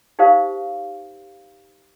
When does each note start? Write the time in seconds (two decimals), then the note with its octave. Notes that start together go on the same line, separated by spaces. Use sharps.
0.19 D#4 G4 A#4 C5 F5